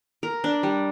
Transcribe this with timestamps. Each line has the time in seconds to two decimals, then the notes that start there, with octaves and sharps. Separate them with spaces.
0.23 A#4
0.44 D4
0.63 G3